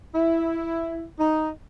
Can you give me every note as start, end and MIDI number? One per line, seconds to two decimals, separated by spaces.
0.15 1.04 64
1.20 1.49 63